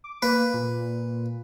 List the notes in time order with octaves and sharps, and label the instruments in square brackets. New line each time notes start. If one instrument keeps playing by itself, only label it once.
[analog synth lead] D6
[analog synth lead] A#3 [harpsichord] B4
[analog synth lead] A#2